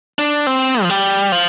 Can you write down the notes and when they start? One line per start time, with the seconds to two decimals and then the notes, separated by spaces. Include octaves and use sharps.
0.19 D4
0.47 C4
0.83 F3
0.90 G3
1.32 F3